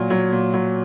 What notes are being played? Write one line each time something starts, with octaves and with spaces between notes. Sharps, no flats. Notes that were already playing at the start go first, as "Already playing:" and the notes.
Already playing: A#2 F#3
F#3
A#2
F#3